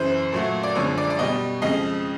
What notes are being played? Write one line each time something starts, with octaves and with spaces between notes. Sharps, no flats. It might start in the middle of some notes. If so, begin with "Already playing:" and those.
Already playing: F#2 C#3 E3 C5
A#2 F#3 A3
D5
F#2 D3 F3 G#3 C#5
D5
D5
B2 G3 D#5
F2 C#3 F3 G#3 D#5